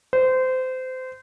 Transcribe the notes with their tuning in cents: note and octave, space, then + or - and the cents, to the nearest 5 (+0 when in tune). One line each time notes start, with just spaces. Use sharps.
C5 -25